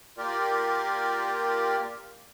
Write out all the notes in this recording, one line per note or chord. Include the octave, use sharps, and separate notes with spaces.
A#3 F4 G4 A#4 D5